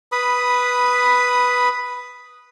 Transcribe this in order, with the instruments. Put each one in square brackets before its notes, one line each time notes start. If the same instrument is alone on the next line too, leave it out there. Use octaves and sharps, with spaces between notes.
[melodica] B4 B5 D#6